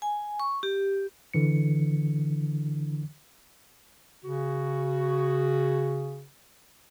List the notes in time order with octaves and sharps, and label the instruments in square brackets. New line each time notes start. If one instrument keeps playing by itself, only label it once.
[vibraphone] G#5
C#6
G4
[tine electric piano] D3 E3 C#7
[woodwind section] C#3 F#4